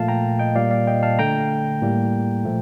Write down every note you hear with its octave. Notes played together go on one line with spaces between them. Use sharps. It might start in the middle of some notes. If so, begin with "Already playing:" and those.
Already playing: A#2 F3 A3 F5 A5
G5 A#5
D#5 G5
A#2 G3 A#3 D5 F5
D5 F5
D#5 G5
F5 A5
D3 A3 G5 A#5
A2 G3 A#3
A#2 F3 A3